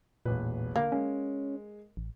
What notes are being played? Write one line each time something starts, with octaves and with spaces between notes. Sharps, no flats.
E1 A1 A#2 B4
D3 A#3
G#3 C#4
A1